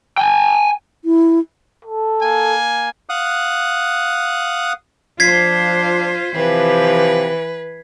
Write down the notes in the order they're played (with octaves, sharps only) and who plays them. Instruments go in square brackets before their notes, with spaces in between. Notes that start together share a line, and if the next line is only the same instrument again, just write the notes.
[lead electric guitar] G5 G#5
[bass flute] E4
[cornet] A4
[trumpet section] A#3 G#5
[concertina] F5 F#5 D#6 F#6
[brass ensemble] F3 D4 [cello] F4 C5 [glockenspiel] G#6 B6 C7
[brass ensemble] C3 F3 G4 [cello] E3 [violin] B4